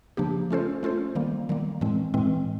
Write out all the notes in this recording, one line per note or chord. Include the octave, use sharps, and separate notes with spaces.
C#3 F3 A#3 D4 G4
A3 C#4 F4 A4 C5
A3 C#4 F4 A4 C5
D#3 G3 A#3
D#3 G3 A#3
A2 E3 G#3 C4
A2 E3 G#3 C4